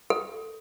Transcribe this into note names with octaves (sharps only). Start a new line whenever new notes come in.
A4